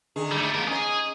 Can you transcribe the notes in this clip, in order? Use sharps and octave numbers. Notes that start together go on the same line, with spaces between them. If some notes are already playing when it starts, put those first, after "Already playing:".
D3 D#3 G#4
G3 A3
E2 A#3 B3 A#4
C#4 G#4 D#5